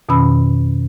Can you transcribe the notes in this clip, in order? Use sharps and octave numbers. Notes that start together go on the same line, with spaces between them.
F2 B2 D#3 C#4 B5 E6